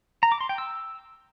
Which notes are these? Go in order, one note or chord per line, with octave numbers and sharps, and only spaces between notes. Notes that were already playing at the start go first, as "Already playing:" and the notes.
A#5
D6
C6
G5
E6